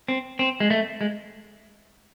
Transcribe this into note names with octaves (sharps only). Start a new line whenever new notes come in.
C4
C4
G#3
A3
G#3